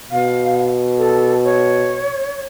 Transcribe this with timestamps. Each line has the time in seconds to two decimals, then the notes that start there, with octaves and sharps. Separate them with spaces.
0.11 B2 F5
0.98 A4
1.44 C#5